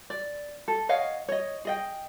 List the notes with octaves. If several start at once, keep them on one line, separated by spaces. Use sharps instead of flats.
D5
A4
C#5 D#5 F5 F#5
C#5 D#5
G#4 D#5 G5